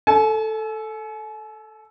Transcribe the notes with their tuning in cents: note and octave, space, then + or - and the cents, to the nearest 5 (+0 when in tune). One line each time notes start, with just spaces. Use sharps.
A4 +0 G#5 +45